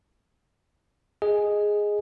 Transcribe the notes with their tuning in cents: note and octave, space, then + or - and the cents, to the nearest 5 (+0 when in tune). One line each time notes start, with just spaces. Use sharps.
G#4 +0 D#5 +0